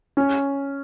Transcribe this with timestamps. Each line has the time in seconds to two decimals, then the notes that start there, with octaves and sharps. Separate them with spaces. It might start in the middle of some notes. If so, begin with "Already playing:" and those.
0.17 C#4